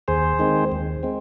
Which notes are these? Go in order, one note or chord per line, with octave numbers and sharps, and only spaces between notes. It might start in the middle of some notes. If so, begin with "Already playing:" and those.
D#2 G#4 C5
D#3 G#3 C4
D#2
G#3 C4